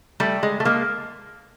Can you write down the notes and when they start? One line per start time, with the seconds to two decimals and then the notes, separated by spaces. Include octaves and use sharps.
0.20 G3 A3
0.43 G#3
0.60 A3
0.65 G#3 A#3